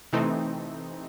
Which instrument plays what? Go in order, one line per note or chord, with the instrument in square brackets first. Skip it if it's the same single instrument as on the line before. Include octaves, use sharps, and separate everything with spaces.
[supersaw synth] C3 E3 A3 C4 D#4